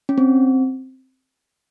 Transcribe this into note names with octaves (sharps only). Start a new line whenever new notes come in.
C#4
C4